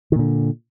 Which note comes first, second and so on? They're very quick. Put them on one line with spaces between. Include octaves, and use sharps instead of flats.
D#3 A#2 D3